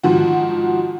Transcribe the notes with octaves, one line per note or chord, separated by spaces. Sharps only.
G#2 D#3 F3 F#4